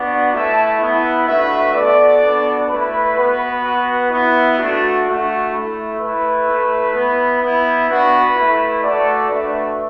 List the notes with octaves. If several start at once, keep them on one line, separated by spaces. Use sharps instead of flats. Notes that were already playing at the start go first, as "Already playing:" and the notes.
Already playing: B3 D4 F#4 D5 F#5
A3 E4 E5 A5
B3 E4
A3 D4 F#4 B4 E5
B3 F#4 A4 D5
B3 D4 F#4
A3 E4 B4
B3 F#4 B4
B3 F#4
B3 E4
A3 D4 F#4
A3 D4 F#4
A3 E4
A3 E4 B4
A3 E4
B3 E4
B3 E4
B3 D4 F#4 B4
A3 E4
A3 F#4 A4 D5
A3 D4 F#4 B4 E5